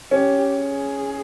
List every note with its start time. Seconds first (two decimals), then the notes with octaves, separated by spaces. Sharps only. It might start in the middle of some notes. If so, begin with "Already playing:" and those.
0.11 C#4 G4
0.55 G#4